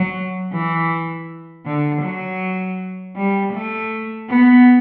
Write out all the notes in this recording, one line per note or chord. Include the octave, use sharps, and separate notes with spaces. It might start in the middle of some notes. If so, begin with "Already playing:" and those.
Already playing: F#3
E3
D3
F#3
G3
A3
B3